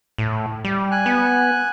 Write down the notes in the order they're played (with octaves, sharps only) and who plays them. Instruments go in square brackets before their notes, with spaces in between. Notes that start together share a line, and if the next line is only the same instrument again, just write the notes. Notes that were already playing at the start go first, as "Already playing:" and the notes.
[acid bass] A2
G3
[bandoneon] G#5 F#6
[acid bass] B3